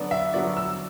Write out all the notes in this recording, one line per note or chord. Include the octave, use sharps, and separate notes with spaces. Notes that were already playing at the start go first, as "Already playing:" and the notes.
Already playing: D3 F#3 B3 F#4 D5
E5
D3 F#3 B3 F#4 D5
E6